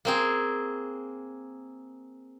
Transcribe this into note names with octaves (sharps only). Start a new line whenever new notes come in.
A#3 C4 G#4